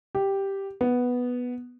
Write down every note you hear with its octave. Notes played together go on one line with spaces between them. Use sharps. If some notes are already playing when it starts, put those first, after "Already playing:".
G4
B3